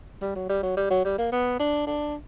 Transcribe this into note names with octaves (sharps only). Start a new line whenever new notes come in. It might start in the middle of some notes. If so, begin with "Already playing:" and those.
G3
F#3
G3
F#3
G3
F#3
G3
A#3
B3
D4
D4